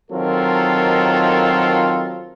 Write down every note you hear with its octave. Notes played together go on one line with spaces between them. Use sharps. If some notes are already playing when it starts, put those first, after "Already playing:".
D#3 F#3 C4 F4 A4 A#4